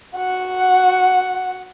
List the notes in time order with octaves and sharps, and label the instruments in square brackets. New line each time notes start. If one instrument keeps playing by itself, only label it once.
[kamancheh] F#4 F#5